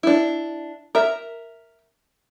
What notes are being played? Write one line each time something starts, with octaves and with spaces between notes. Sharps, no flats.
D4 E4
A#4 E5